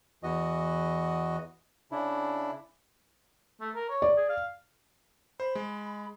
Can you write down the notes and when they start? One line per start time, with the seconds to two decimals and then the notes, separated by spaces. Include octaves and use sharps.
0.23 E2 E3 F#4 D#5
1.91 C#3 D4 E4
3.61 A3
3.75 A#4
3.90 C#5
4.02 D5
4.17 G#4
4.29 F5
5.40 C5 B5
5.55 G#3